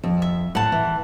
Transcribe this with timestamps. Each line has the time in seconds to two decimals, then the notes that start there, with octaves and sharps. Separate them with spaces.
0.03 F2
0.22 E5
0.55 A2 F#5 A5
0.72 E3